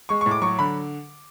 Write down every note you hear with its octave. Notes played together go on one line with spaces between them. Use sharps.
G#3 C#6
C#6
A2
D6
F#3 C#6
D3 B5